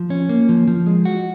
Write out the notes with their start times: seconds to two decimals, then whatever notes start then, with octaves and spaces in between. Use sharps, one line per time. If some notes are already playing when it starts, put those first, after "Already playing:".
Already playing: F3
0.10 C#4
0.29 A#3
0.49 F3
0.68 F3
0.87 G#3
1.05 F#4